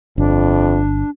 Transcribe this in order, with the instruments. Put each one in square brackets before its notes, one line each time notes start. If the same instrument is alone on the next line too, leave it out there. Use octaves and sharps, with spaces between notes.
[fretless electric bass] G1 [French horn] F2 [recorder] D4